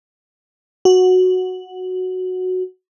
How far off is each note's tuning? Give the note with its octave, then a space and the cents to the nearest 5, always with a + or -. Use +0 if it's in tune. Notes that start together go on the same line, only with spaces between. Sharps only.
F#4 -5